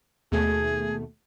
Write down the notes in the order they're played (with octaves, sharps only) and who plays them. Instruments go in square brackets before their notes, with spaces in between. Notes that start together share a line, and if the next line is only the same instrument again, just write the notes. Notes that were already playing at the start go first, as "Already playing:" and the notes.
[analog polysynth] D#2 B2 A3 [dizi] G#4